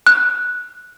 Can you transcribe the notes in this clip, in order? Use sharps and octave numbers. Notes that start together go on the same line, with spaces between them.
F#6